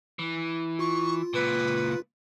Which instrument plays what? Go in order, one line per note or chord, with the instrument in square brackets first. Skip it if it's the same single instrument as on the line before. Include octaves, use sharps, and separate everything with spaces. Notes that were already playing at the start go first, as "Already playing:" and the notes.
[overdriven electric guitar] E3
[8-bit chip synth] F4 [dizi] C#6
[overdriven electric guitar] C#2 A#2 [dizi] B4